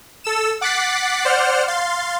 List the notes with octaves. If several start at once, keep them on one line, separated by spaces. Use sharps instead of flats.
A4 E6 E7
F#5 D6 F#6 A6 B6 C7
C5 D5 F#5 F6 G6
F5 C6 A6